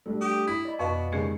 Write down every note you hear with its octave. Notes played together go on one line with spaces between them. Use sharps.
G3 A3 D4 A4
G4 D#6
E4 B6
D5 D#5 B5
F2 B2 F5 C#6
D#2 C#3 G#3 G#4 C#6 C7 C#7